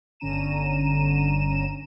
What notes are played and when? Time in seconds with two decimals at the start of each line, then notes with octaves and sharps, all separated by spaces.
0.20 G1 D3 C#4 A#5 D#7 E7